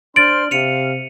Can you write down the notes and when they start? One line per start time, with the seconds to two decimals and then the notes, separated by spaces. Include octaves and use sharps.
0.16 D4 C5 C6 F6 A6 D7 F#7
0.51 C3 F5 C#7 D#7 F7